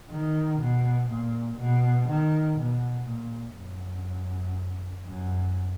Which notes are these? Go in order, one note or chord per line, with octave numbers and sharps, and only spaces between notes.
D#3
B2
A#2
B2
D#3
B2
A#2
F#2
F#2